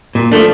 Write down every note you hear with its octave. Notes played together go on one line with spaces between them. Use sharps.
A#2
F3 A3 D4